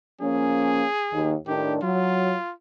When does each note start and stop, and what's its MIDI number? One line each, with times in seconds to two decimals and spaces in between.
0.21 0.84 53
0.21 0.84 58
0.21 0.84 61
0.21 1.33 68
1.12 1.34 39
1.47 1.82 45
1.47 1.82 51
1.47 1.82 62
1.47 1.74 67
1.82 2.34 54
1.82 2.53 65